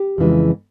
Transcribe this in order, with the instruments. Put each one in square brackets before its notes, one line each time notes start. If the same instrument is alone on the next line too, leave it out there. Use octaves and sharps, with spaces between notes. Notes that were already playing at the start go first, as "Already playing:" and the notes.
Already playing: [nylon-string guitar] G4
F2 C#3 E3 G#3